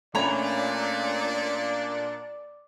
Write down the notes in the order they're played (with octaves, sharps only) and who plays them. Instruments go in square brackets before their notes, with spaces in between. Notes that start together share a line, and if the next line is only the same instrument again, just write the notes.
[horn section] A#2 D4 [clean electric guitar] A3 C#4 [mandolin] C#5 A#5 B5 [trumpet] D5